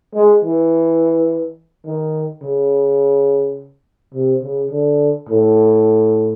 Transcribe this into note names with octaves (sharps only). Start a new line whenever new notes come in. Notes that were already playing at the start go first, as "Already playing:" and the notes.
G#3
E3
D#3
C#3
C3
C#3
D3
A2